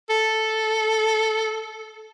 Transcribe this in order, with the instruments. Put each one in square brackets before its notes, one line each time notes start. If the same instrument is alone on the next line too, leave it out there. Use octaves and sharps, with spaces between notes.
[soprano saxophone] A4